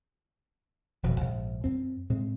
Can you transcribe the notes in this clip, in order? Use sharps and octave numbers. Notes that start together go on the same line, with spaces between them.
D#1 F2 B2
A#1 G#2
F#2 C4
A2 G#3 C4